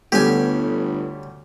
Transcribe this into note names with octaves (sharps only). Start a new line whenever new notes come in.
G1 D2 G3 A3 B3 C#4 G4 G#5